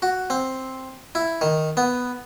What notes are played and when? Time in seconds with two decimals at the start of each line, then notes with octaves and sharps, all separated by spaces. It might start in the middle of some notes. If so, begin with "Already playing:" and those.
0.02 F#4
0.30 C4
1.15 E4
1.41 D#3
1.77 B3